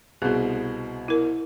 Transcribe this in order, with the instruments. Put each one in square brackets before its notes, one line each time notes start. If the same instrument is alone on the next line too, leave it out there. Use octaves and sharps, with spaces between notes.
[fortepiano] C2 B2 [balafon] G#4
[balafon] E4 A#4